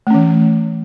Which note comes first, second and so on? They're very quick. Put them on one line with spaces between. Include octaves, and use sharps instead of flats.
A3 C#4 E3